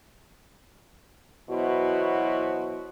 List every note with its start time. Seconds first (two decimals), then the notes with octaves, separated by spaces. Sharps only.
1.50 E2 B2 F#3 E4 F#4 C5